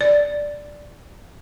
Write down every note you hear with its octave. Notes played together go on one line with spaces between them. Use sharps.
D5